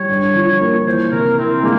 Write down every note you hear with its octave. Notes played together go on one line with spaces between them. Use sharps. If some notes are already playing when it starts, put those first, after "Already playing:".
Already playing: G3 C#5
G2
F3
A#3
E3 C5
C3 A#4
C4 E4
G#3 A#3